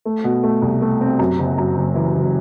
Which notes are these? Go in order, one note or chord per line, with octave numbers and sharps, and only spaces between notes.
A3
B2
A3
C2
A3
C4
F#2
F#1
F#2
F#1
E3
F#1